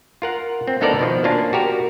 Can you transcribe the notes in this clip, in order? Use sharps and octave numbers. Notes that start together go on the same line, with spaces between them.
F4 A#4 F#5
C4
D2 B3 D#4 A4 A#4 D5
B2 D#3 F3
A#3 C#4 D4 F4
F#4 G4 A#4